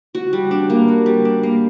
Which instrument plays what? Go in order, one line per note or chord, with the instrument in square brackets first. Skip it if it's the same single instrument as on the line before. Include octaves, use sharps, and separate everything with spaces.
[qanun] F#4
G3
D4
A#3
F#4
G3
D4
A#3